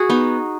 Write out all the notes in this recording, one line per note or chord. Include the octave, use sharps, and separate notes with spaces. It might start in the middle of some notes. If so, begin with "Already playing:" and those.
Already playing: F#4 G#4
B3 D#4